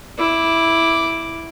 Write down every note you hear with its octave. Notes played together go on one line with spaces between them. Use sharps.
E4 D6